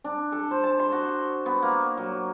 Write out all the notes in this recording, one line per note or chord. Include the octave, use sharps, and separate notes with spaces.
D4
A4
C5
A5
C6
F#4
B3
A#3
F#3